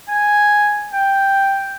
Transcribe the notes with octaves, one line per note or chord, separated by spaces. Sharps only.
G#5
G5